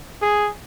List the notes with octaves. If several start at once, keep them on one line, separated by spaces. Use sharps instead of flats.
G#4